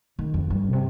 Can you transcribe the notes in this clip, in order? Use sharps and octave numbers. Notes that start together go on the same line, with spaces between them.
D#3
F2
G2
C3